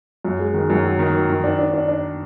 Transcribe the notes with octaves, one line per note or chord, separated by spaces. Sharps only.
F#2
G#3
D#3
F#2
F#3
D#3
F#3
D#3
D4
D4
D4
D4